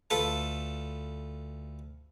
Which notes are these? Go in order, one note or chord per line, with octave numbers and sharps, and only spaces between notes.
D2 F4 A4 B4 A5